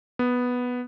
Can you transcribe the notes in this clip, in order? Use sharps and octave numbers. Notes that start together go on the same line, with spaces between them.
B3